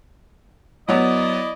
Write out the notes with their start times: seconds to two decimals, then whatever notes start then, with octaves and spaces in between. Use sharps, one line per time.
0.89 F#3 B3 E4 D5 D#5